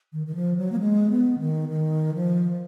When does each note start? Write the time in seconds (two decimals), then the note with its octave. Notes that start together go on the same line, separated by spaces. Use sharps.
0.13 D#3
0.27 D#3
0.35 F3
0.57 F#3
0.72 A#3
0.80 G#3
1.10 B3
1.39 D#3
1.69 D#3
2.14 F3